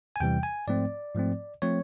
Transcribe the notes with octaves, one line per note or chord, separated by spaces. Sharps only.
G#5
E2 C3 E3 G3 G5
G#5
G#2 F3 A3 C4 D5
G#2 F3 A3 C4
F3 A3 C4 C#5